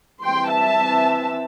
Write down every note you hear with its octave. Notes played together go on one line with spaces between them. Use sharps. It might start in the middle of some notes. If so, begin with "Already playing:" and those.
E3 G3 C4 G5 C6
E5 A5
E3 C4